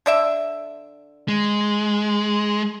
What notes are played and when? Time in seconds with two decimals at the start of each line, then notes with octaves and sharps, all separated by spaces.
0.06 D3 D5 E5
1.28 G#3